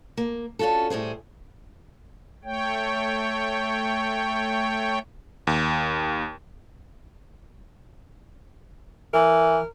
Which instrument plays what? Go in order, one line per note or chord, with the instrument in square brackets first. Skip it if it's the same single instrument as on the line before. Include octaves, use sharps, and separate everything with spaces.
[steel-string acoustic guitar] A#3
C#4 D4 F4 F#4 A4
A2 G3 G#4 C5
[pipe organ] A3 C#5 G5
[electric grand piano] D#2
[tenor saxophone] E3 [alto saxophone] A#4